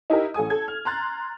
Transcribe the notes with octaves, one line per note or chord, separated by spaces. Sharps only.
D#4 E4 G4 A#4 D#5
A1 A4 G#5 D#6
A4 G#6
F6
A#5 C6 F#6 A6